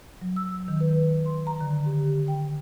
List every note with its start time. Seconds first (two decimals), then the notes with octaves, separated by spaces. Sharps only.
0.22 F#3
0.36 E6
0.68 D#3
0.81 B4
1.26 C6
1.47 A#5
1.61 D3
1.86 G4
2.28 G5